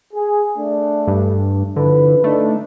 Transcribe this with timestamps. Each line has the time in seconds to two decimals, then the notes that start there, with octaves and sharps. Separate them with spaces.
0.13 G#4
0.57 A3 D4
1.07 G2
1.76 D3 F3 E4 B4
2.24 A3 D4 D#4